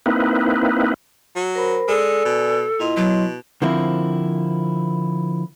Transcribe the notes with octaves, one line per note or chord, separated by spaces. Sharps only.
A#3 C4 D#4 E4 B4
F#3
A#4 C5 B5
G#3 A4 D5 G#5
B2
A#2 E4 D#5 C6
B2 F#3
D3 F3 A#3 C4 E4